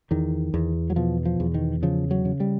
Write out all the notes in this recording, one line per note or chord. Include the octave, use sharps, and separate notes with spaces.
E2 D#3
E2
F#3
B2 F3
F3
E2
D#3
C#3 F3
F#3
C#3
G3